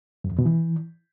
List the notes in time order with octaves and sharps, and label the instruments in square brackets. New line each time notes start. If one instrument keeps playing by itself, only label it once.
[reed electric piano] F#2
F2
B2
E3